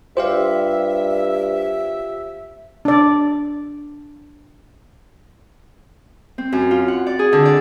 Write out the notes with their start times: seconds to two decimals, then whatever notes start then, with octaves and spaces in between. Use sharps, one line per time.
0.17 G2 F4 G4 C5 E5 F5
2.85 D4 D5
6.38 C4
6.52 F#2
6.71 F4
6.88 F#5
7.07 D5
7.19 G#4
7.33 D3
7.45 D5